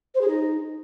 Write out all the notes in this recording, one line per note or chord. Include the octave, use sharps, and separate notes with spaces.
C5
G#4
D#4